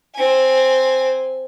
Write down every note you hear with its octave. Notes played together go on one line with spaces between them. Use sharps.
C4 G#5